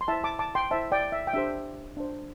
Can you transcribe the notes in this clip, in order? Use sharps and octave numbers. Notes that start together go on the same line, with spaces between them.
C6
E4 C5 E5 A5
A5 D6
A5 D6
G5 C6
E4 C5 E5 A5
D5 G5
E5
G5
D4 G4 C5 E5
D4 C5